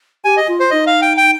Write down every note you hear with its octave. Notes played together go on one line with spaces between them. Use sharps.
G4 G#5
D#5
F4
C5
D#4 D#5
F5
G5
G5